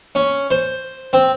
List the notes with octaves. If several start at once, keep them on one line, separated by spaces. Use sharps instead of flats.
C#4
C5
C4